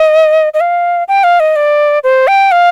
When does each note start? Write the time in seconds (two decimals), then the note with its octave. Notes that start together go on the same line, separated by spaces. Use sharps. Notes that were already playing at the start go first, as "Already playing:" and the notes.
Already playing: D#5
0.54 D#5
0.60 F5
1.08 G5
1.24 F5
1.40 D#5
1.56 D5
2.04 C5
2.28 G5
2.52 F5